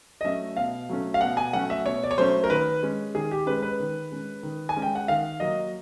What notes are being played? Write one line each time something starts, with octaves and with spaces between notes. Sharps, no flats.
D#5
F#3 A3 C#4 E5
B2 F5
F#3 A3 C#4
F5
B2 F#5
G#5
F#3 A3 C#4 F#5
E5
B2 C#5
D5
C#5
F#3 A3 C#4 C5
A#4
D#3 B4
G#3 C#4
D#3 G#4
G4
G#3 C#4 B4
B4
D#3
G#3 C#4
D#3
G#5
G#3 C#4
G5
F#5
D#3 F5
F#3 A#3 D#5